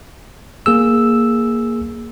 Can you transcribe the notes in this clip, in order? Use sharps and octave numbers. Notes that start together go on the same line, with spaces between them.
A#3 G#4 E6